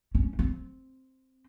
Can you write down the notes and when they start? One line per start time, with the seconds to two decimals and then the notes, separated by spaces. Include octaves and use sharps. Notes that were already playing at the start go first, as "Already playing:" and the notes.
0.15 C#4
0.39 C4